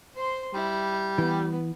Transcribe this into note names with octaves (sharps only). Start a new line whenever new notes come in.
C5 C6
G3 E4
E3 B3